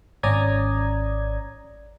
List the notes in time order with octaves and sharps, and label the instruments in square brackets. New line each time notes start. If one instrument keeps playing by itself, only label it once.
[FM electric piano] G#1 C#4 D5 A#5 D#6 G#6